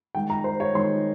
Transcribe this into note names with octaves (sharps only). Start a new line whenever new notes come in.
D#3 G#3 D#4 G5
A#5
C5
C#5
D#3 G#3 D#4 C6